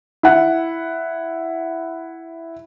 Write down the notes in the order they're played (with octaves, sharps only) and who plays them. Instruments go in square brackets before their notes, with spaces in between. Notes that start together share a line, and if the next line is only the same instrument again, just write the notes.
[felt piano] E4 F#5